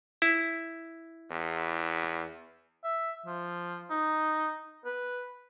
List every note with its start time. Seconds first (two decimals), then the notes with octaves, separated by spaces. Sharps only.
0.22 E4
1.31 E2
2.84 E5
3.26 F3
3.90 D#4
4.85 B4